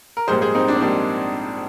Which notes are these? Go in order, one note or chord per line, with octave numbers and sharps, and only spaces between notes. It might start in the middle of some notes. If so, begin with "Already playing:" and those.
A#4
A#1 G#2 G3 A#3 G#4 C5
G#4 C5
C4 D#4
D4
C4
A#1 G#2 G3 A#3 D4